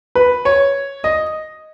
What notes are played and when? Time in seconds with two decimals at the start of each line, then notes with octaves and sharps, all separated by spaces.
0.15 B4
0.45 C#5
1.04 D#5